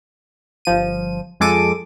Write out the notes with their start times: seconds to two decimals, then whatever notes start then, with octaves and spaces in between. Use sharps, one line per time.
0.65 G1 F3 D#7
1.40 F2 G#3 A4 D6 D#7